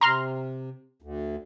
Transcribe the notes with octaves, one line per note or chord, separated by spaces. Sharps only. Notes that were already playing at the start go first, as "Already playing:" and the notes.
C3 A#5 C6 F6
D2